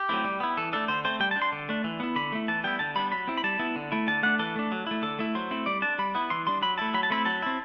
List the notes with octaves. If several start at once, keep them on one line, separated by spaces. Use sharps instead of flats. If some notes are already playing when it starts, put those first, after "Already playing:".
Already playing: G4
F#3 A3 C4 E4
G3
B3 E4
E3 A4
A3 D4 A4
D3 C5
A3 C4 C5
G3 G5
A5
D4
C6
D3
A3 D4
E3
B3 E4
D3 B5
A3 E4
E3 A5
G3 B3 E4 G5
D3 A5
G3 B3 D4 B5
F#3 B5
C4 E4
B5
G3 A5
B3 E4
D3
A3 E4
D3 A5
A3 D4 F#5
E3 A4
A3 D4
F#3
A3 E4
D3 A4
A3 E4
F#3 C5
A3 C4 E4
G3 D5
D4 A5
G3 B5
B3 E4
E3 C6
G3 D4 C6
F#3 B5
A3 E4 A5
F#3 B5
A5
A3 C4 E4 B5
F#3 A5
C4 E4